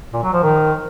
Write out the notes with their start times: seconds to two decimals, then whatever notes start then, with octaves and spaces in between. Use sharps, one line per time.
0.13 A#2
0.23 F#3
0.33 F3
0.43 D#3